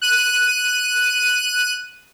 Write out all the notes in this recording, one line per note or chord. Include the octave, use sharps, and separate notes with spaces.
F#6 D#7